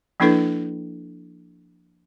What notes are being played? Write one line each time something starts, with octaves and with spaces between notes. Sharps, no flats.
F3 A#3 D4 E4 A4 B4